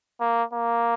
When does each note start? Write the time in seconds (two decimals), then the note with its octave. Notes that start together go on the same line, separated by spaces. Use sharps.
0.21 A#3
0.54 A#3